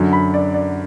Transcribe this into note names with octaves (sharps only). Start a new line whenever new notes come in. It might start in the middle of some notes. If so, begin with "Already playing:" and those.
Already playing: F#2 D3 F#3
B5
D5
D5